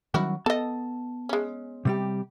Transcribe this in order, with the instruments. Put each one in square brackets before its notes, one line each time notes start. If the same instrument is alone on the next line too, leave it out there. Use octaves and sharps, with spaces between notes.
[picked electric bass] D#3 F#3 G3 [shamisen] C#4 E4 F#4
[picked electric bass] B3 [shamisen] A4 D#5 [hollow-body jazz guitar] A5
[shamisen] G#3 C#4
[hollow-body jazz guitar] C3 G3 G4